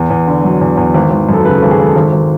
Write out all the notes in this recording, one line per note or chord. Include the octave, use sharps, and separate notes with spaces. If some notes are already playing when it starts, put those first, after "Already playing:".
Already playing: E2
E2
D3
F#3
E2
E2
G#1
G#1
F#2 A4
C#3 B4
A4
G#1
G#4
G#1 A4
G#1
G#1